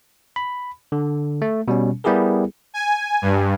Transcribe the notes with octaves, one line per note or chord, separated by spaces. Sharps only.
B5
D3
A3
B2 G3 C#4
G3 B3 E4 G4 G#4 A#4
G#5
G2